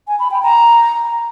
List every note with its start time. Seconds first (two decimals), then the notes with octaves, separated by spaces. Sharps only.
0.08 G#5
0.19 B5
0.31 G5
0.43 A#5